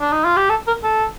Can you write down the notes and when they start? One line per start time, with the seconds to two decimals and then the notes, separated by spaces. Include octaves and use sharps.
0.01 D4
0.12 D#4
0.25 F4
0.37 G4
0.50 A4
0.67 A#4
0.84 A4